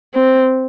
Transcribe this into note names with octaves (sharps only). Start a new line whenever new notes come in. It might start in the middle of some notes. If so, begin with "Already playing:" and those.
C4